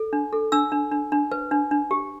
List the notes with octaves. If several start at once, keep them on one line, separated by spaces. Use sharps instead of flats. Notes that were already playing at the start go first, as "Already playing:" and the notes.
Already playing: A4
D4
A4
D4 E6
D4
D4
D4
B4
D4
D4
G4